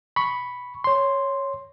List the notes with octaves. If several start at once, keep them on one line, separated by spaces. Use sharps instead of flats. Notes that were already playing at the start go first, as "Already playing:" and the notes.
B5 C#6
C#5 C6